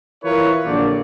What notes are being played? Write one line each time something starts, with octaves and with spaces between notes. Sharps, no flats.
E3 E4 F4 A#4 B4 C#5
A#1 D3 F#3 A#3 C4 D5